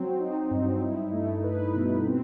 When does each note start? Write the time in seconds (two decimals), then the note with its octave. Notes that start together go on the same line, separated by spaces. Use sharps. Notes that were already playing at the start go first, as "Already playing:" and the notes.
Already playing: F#3 C4
0.20 D#4
0.51 G2
0.82 E4
1.13 A3
1.44 B4
1.75 B2
2.06 C4